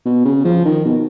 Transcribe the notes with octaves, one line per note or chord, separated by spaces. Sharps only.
B2
C#3
F3
D#3
B2